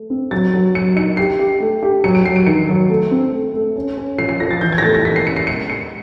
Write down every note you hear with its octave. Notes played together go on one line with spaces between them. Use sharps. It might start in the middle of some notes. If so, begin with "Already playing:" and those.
Already playing: A3
C4
F#3 A6
F#3
F#3 C#7
D#4 C#7
G4 C7
G4
A3
G4
F#3 C#7
D7
F#3 C7
D7
D#3 C#7
F#3
A3
C4
A3
A3
C#4
C#4
F3 C7
C7
F3 A#6
A6
E3 G6
G#6
A#6
A3 A6
A#6
E3 B6
C7
C#4 C#7
C7
G#3 C#7
G#3 C#7